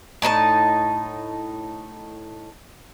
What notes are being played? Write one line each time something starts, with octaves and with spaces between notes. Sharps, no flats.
A2 D#4 F4 A5